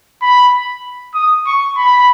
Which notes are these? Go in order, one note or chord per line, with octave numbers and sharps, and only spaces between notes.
B5
D#6
C#6
B5